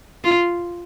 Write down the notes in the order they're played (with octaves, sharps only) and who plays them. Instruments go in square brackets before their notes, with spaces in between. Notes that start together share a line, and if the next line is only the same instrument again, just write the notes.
[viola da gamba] F4